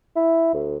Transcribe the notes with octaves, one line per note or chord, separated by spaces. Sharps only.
E4
D2